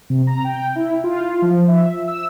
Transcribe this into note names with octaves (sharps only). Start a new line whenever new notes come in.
C3
A#5
G5
E4
F4
F3
E5
E6